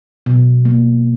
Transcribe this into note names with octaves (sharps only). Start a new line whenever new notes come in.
B2
A#3